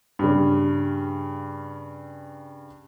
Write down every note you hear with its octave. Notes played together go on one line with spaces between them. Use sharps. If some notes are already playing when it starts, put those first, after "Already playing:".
G2 C#3